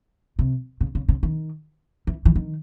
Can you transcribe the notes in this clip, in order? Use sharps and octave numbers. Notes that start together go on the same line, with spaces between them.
C3
C#3
C#3
C#3
D#3
E3
E3
D#3